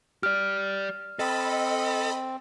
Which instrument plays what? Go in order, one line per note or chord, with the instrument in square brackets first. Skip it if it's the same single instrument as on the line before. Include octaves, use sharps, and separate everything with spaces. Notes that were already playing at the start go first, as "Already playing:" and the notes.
[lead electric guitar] G4 D5 [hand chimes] F6
[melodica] C4 [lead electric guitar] A4 [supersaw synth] D#5 B5